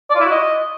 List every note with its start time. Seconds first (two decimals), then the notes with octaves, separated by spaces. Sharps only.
0.10 D5
0.15 F4
0.20 E4
0.25 F#4
0.30 D#5